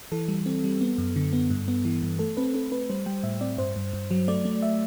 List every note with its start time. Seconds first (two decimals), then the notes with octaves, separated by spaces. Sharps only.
0.12 E3 A4
0.28 G3
0.46 C4
0.64 G3
0.81 B3
0.98 F#2
1.16 D3
1.33 B3
1.50 G2
1.68 B3
1.85 E3
2.03 G2
2.19 A3 A4
2.37 C4 B4
2.54 C4 A4
2.71 C4 B4
2.90 G3 C5
3.06 G3 G5
3.24 A2 E5
3.41 C4 D5
3.58 G2 C5
3.76 G2
3.94 G2
4.11 F#3
4.28 A3 D5
4.45 A3
4.62 E5